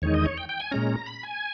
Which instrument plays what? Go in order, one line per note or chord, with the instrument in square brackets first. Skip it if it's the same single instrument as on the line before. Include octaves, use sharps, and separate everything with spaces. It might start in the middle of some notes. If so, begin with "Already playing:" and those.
[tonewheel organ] E2 D#3 G#3 D#4 C#5
D#5
C#5
G5
G5
G#5
A#2 G#3 C#4 A#5
B5
G#5